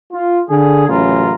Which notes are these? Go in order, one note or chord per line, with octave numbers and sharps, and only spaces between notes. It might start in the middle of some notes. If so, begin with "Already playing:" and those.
F4
D3 G#4
A1 F#2 C#3 F4 A#5